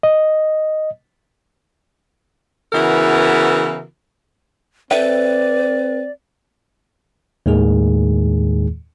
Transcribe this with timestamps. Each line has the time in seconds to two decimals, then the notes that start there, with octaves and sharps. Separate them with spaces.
0.03 D#5
2.73 C#3 E3 B3 E4 F#4 A#4
4.91 C4 A4 B4 D5 E5 G5
7.46 D#2 A2 D#3 G#3 G#4